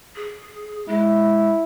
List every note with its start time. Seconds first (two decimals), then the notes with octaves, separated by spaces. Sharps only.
0.16 G#4
0.88 G#3 E4